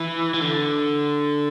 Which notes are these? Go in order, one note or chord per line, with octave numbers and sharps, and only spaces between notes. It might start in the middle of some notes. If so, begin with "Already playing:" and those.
Already playing: E3
E3
D3